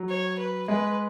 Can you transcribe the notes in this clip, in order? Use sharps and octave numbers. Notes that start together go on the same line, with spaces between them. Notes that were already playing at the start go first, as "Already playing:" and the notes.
Already playing: F#3
C#5
B4
G#3 B4